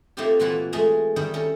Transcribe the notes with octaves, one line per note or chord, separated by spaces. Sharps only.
A3 A#3 C4 D#4 F4 G4
A#2 E3 A#3 F4 F#4 B4
G#3 A3 G#4 A#4
D#3 G3 D#4 E4
C#4 A4 A#4